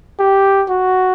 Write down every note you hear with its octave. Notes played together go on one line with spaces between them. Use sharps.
G4
F#4